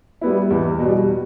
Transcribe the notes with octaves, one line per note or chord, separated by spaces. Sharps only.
G3 B3 E4
E2
B2 G3